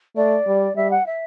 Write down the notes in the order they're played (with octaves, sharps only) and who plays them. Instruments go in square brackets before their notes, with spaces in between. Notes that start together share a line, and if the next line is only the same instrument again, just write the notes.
[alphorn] A3 [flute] D5
[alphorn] G3
[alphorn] G3 [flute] E5
[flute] F#5
E5